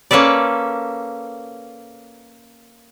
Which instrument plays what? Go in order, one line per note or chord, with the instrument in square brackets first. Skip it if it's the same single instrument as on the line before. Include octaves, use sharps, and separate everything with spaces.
[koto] A#3 C#4 A4 B4 D5